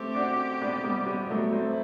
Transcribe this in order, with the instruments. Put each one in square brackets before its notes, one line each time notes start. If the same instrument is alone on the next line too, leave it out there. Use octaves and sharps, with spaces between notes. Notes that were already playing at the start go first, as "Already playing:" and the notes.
Already playing: [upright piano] A3 C4 [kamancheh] G4
[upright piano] D4 F#4
B3 D4
G3 B3
G3 B3
F#3 A3
[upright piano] A3 C4 [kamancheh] E4